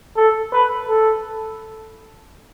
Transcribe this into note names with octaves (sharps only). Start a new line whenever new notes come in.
A4
B4
A4